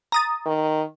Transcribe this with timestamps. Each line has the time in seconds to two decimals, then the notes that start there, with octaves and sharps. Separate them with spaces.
0.12 A#5 D#6 A6
0.46 D#3